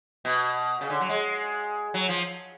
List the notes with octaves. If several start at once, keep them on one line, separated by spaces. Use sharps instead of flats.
B2
C#3
D3
F#3
G#3
F#3
F3